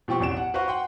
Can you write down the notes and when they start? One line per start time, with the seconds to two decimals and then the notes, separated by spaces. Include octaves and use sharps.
0.08 B2 F3 C4 G4 C#6
0.20 A1 E2 D7 E7
0.37 F#5
0.54 F#4 B4 C5 F5 F#5 C#6
0.68 F#5 G5 C6